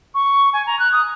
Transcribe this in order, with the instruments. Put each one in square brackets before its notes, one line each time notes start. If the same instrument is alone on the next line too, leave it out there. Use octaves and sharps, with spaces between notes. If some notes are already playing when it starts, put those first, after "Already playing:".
[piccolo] C#6
G#5
A#5
F#6
D#6